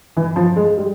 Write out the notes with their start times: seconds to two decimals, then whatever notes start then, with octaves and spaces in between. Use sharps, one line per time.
0.17 E3
0.36 F3
0.56 G#3
0.77 G3